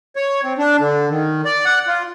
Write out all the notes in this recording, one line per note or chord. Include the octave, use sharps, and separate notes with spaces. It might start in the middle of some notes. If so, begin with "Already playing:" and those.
C#5
C4
D4
D3
D#3
D5
F#5
F4